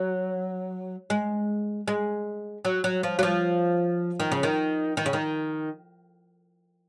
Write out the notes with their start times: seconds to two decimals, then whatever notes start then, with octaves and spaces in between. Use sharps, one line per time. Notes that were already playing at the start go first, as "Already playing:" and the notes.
Already playing: F#3
1.10 G#3
1.88 G#3
2.65 F#3
2.84 F#3
3.03 F3
3.19 F#3
3.23 F3
4.20 D#3
4.32 C#3
4.43 D#3
4.97 D#3
5.06 C#3
5.13 D#3